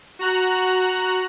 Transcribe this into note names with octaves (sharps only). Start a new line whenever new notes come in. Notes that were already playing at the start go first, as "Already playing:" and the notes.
F#4 A#5 F#6